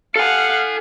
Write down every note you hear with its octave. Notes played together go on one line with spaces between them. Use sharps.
A4 F5 F#5 G#5